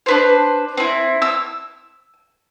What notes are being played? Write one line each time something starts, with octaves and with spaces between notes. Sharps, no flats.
D4 B4 C5
C4 E4
E6